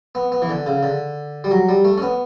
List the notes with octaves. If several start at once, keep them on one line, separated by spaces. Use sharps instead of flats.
B3
B3
E3
D3
C#3
D3
G3
F#3
G3
A3
C#4
B3